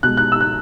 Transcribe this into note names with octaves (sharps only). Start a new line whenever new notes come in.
B2 G#3 F#6
F#6
E6
F#6